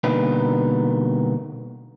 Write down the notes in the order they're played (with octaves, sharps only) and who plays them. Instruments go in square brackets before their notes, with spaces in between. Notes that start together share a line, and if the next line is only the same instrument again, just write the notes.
[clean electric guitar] B2 D3 G3 A#3 D#4 B4